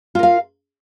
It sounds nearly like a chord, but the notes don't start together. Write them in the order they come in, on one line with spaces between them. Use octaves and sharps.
F4 A#4 F5